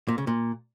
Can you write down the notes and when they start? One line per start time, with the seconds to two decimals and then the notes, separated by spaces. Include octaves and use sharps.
0.08 A#2
0.18 C#3
0.27 A#2